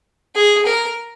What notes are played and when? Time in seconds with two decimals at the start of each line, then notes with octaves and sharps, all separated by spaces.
0.35 G#4
0.65 A#4